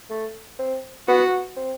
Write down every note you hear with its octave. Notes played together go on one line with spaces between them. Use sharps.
A3
C4
B3 F#4
C4